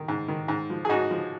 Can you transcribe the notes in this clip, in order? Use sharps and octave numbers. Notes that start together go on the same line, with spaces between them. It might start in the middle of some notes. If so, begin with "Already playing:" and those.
Already playing: D#3
G#2
D#3
G#2
F3
G#4
G#2 D#4 F#4
F3